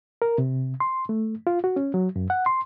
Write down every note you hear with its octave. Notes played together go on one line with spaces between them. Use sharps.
A#4
C3
C6
A3
F4
F#4
C#4
F#3
F#2
F#5
C6